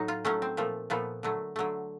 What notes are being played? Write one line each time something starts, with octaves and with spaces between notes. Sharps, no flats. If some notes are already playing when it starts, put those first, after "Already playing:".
Already playing: A2 F#3 D#4
F4
A2 F#3 A3 C#4
C4
A#2 F3 A3
A#2 F3 A3 B3
D3 F#3 A3
D3 F#3 A3